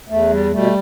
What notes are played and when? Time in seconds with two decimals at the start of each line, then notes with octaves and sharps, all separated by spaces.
0.09 E2 A3
0.30 G3
0.51 B2 G3 A3